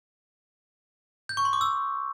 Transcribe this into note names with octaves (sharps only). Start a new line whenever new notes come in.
G6
C#6
C6
D6
E6